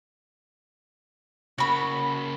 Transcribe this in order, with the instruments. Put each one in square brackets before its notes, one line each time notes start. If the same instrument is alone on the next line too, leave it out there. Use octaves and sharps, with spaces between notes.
[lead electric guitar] C#3 A#3 [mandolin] F#4 B5